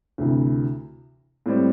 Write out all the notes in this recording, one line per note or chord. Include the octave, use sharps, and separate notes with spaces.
D2 C3 E3
A2 G3 C4